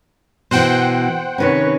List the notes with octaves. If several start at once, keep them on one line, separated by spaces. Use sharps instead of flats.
B2 E3 C5 F#5 G5
C3 D#3 C#4 B4 C#5